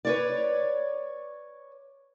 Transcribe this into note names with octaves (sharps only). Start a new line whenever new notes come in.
B4 C#5 D5